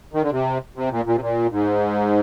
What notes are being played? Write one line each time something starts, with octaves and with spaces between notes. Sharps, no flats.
D#3
D3
C3
C3
A#2
A#2
C3
A#2
G#2